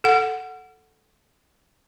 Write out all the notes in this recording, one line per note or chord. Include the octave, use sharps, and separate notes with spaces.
A4 F#5